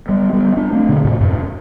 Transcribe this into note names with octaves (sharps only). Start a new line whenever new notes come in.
G3 B3
G3 B3
B3 D4
A3 C4
B2 D3
A2 C3
F#2 A2
A2